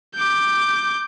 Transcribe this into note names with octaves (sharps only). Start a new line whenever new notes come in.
D6 G6